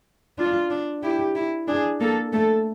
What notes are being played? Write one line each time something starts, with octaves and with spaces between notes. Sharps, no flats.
D4 F4
D4
E4 G4
E4
D4 G#4
A#3 A4
A3 A4